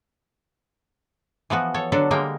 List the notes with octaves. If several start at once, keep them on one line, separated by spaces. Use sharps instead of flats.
E3 F3 B3 F#4
A4 C#5
D3 F#3 D4 F#4 A4
D3 G3 G#3 A#3 A#4 G5